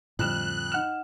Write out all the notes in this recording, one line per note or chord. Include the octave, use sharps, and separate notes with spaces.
F2 A2 D3 G3 F6 F#6 E7
D#4 F#5 F6 E7